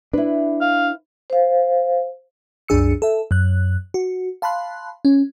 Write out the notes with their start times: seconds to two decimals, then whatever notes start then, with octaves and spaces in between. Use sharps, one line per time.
0.13 D4 E4 B4
0.61 F5
1.30 C5 F5
2.68 C2 F#2 D4 G#4 E6 C#7
3.02 A4 E5
3.31 F#2 F#6
3.94 F#4
4.42 F5 A5 B5 C6 F#6
5.05 C#4